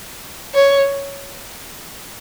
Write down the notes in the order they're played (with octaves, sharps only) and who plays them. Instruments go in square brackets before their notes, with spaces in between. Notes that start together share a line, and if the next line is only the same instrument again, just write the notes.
[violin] C#5